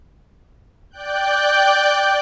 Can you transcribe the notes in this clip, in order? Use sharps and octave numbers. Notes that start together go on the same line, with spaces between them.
D5 G5 F#6 G6